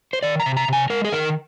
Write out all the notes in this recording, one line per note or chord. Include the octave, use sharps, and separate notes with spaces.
C5
D#3 D5
A#5
C3
A#5
C3 G#5
G#3 A#4
G#4
D#3 A#4